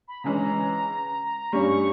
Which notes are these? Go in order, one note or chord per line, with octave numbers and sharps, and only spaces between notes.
B5
C#3 E3 G#3 C#4 A#5
G2 G3 C#4 C#6